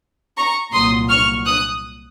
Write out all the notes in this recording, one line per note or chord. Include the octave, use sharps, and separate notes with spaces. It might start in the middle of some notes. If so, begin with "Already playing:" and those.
A#5 C#6
C2 A#2 F#3 C6 D#6
C#6 F6
D#6 F#6